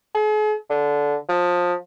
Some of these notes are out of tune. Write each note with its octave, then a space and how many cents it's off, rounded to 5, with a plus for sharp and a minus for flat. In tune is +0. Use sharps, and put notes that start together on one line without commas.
G#4 +45
D3 -15
F3 +20